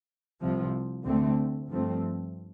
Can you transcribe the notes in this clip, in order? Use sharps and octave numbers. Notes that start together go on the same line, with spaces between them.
C2 C3 F3
D2 D3 A3 C4
G2 F3 A3 C4